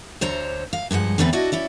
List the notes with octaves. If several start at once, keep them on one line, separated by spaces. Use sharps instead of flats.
D2 D3 C5 C#5 A#5
F5
G2 F3 G#3 F#5
E2 D3 A3 C4 G4 B4
D4 E4 F#4 D#5
C#4 E4 D5